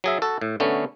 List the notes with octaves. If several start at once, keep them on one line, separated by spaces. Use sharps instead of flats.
F#3 G#4 E5
F#4 A4
A2
D3 A3 B3 C#4